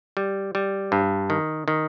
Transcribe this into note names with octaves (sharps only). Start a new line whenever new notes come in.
G3
G3
G2
D#3
D#3